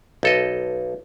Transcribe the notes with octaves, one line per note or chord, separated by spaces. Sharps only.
B1 A4 D#5